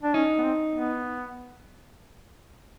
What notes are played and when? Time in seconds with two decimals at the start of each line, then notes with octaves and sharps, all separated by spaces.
0.03 D4
0.14 C#4 D#4
0.38 B3
0.43 C4
0.72 B3